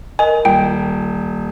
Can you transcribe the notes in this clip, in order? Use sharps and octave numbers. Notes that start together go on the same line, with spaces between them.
A#4 D#5 G#5
D#1 G5 D7